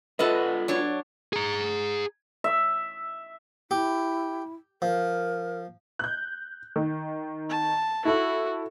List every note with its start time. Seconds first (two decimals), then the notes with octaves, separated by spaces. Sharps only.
0.19 B3 F4 A4 B4 D#5 F#5
0.68 F#3 D4 C#5
1.33 G#4 A#5
2.44 E5
3.71 E4 G4
4.82 F3 A#4
5.99 F#6 G6
6.76 D#3
7.50 A5
8.05 E4 F#4 A4